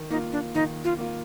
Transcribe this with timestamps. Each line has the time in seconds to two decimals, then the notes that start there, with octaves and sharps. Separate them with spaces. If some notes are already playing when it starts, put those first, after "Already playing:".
Already playing: D#3
0.10 A#3 D#4
0.14 F4
0.32 D4
0.55 D#3 D#4
0.84 F4
0.98 A#3 F4